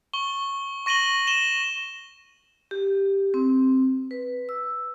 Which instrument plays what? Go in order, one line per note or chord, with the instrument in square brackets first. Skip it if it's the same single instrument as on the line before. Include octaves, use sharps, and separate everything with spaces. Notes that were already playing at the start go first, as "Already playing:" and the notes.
[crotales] C#6 G7
C#6 A#6 D#7 F#7 G7
D#7 E7 G7
[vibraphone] G4
C4
B4
E6